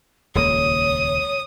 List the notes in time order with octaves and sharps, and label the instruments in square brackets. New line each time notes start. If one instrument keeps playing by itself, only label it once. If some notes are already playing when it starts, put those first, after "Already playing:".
[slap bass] D#1 C#2 A#3 [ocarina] C#5 [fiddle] D#6